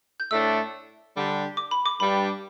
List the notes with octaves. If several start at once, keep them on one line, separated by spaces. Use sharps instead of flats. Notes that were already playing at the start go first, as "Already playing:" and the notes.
G6
A2 A3 D4 A4 E6
D3 G3 D4 G4
D6
B5
D6
G2 G3 D4 G4 B5